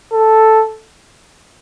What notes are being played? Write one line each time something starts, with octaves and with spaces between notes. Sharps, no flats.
A4